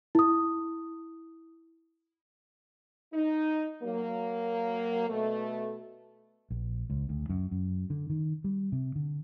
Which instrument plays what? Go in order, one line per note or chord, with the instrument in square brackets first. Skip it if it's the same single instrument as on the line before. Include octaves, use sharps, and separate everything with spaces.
[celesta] E4 D#6
[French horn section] D#4
F#3 A#3
B2 A3
[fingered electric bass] A#1
C#2
D2
F#2
F#2
D3
D#3
G3
C3
D3